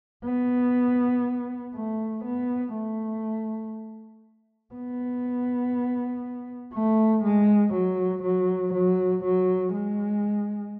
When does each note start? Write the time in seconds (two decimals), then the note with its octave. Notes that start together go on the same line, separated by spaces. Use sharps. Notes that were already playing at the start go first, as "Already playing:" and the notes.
0.24 B3
1.74 A3
2.24 B3
2.74 A3
4.74 B3
6.73 A3
7.23 G#3
7.73 F#3
8.23 F#3
8.73 F#3
9.24 F#3
9.73 G#3